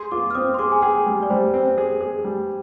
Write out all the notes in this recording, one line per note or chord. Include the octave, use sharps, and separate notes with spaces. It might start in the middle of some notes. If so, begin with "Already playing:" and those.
Already playing: G#4 C6
F4 D6
F6
C4 D#6
C6
G#4 D6
G#5
G#4 G5
G3
D5
G3 C5
C4
C5
G#4
G#4
G3